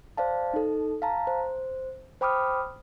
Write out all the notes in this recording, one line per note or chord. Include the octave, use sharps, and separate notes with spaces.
C5 D5 F5 A5
D#4 A4
F5 A5 A#5
C5
C5 G5 B5 D6 D#6 F6